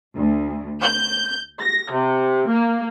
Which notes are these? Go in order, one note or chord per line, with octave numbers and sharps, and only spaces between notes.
D2
G6
A#6
C3
A#3